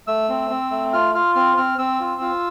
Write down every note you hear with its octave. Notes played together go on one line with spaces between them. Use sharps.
A3 E6
C4
C4
A3
F4 F6
F4 F6
C4 F6
C4 F6
C4 E6
F4
F4